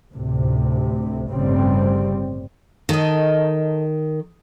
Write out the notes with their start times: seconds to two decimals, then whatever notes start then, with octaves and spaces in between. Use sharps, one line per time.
0.11 D2 A2 C3
1.30 G1 A2 C#3 G3 C4
2.89 D#3 A4 D#5